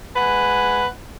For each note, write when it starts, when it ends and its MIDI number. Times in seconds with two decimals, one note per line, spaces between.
0.15 0.85 56
0.15 0.85 71
0.15 0.85 78
0.15 0.85 80